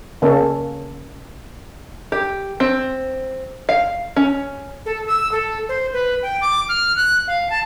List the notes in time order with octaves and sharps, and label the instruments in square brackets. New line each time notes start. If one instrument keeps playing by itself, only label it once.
[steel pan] C#3 A#3 C#4 A4
[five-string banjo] G4
C4
F5
C#4
[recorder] A4
E6
A4
C5
B4
G5
D6
F6
F#6
F5
A5